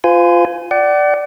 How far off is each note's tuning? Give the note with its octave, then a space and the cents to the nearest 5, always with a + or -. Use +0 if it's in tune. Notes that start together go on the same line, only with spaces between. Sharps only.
F4 +0 C5 -40 G#5 +0
D5 +0 F#5 +40